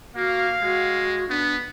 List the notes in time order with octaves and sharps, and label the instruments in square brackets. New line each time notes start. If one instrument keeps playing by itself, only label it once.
[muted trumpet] A#3 [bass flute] F#4 [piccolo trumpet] F5
[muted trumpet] G#3 [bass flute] F#4
[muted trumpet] B3 [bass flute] D4